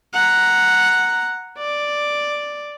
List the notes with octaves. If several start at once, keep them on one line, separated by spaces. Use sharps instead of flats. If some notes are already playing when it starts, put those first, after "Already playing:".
F#5 A#5
D5